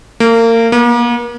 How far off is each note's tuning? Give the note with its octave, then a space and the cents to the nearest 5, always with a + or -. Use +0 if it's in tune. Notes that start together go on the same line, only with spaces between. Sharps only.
A#3 -30
A#3 +40